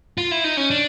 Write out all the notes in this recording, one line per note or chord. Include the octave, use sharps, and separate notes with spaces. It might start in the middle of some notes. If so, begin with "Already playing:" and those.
F4
E4
D#4
C#4
D4